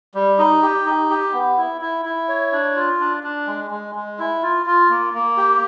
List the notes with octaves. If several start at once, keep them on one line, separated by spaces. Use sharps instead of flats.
G3
D#4
G4
D#4
G4
B3
E4
E4
E4
C#5
D4
F4
D4
D4
G#3
G#3
G#3
E4
F4
F4
A#3
A#3
G4